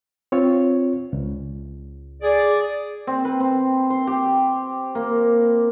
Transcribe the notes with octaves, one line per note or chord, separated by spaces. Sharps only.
C4 F4 C#5
C#2
G#4 D5
C4
B4
C4
C5
G4
A#3